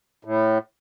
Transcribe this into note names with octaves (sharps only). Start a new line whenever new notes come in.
A2